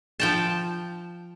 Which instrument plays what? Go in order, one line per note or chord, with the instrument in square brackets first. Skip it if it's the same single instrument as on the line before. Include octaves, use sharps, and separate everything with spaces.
[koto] F3 G5 A5